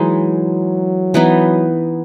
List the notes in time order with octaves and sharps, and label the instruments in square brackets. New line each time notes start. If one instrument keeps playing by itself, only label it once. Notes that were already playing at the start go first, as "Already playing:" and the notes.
Already playing: [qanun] E3 G#3 D#4 [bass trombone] F#3
[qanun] E3 B3 D#4